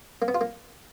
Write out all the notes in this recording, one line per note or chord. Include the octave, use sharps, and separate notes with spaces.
A#3
B3
F4
A#3